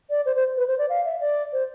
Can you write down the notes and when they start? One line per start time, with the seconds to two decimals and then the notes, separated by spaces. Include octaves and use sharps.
0.10 D5
0.26 C5
0.36 C5
0.57 B4
0.68 C5
0.78 D5
0.90 F5
1.05 E5
1.21 D5
1.53 C5